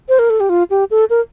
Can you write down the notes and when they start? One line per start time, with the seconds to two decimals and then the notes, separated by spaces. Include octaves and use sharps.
0.09 C5
0.19 A#4
0.30 A4
0.40 G4
0.49 F4
0.70 G4
0.91 A4
1.10 A#4